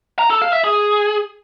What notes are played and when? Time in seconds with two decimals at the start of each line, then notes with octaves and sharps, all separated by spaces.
0.19 A#5
0.30 A4
0.42 F5
0.53 E5
0.64 G#4